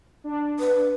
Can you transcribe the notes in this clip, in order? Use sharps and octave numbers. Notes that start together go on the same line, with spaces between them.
D4
B4